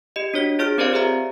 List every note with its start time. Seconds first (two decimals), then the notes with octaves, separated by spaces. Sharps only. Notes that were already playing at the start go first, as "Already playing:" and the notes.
0.16 G4 D#5
0.34 D4 F#4 C#5 B6
0.59 F4 G#4 C#5 F6 D7
0.78 C4 G4 A#4 C5 D5 F5
0.93 G4 G#4 A#4 E5 A#5